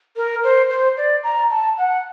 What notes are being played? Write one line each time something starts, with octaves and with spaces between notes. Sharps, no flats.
A#4
C5
C5
D5
A#5
A5
F#5